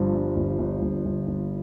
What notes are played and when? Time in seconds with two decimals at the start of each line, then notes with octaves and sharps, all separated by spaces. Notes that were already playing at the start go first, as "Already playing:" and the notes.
Already playing: G1 G2 F3
0.14 G2
0.36 G1
0.58 G1
0.82 G1
1.05 G1
1.28 G1